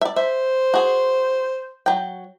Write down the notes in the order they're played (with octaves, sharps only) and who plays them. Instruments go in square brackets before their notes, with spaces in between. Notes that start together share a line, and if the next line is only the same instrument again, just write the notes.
[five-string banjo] D5 E5
[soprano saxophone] C5 [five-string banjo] E5
[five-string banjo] F#4 G#4
F#3 G5